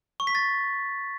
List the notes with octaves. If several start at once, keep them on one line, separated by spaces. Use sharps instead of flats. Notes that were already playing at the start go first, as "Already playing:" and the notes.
C#6
B6
A6